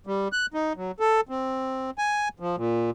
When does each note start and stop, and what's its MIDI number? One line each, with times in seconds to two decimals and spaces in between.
0.07 0.28 55
0.33 0.46 90
0.54 0.73 63
0.77 0.92 54
1.00 1.21 69
1.29 1.91 60
1.98 2.28 80
2.40 2.56 53
2.57 2.90 46